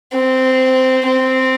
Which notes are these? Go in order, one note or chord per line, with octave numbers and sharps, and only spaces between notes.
C4
C4